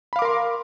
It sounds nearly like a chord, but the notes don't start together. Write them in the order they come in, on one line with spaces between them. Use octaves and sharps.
B5 F5 D6 A#4 C6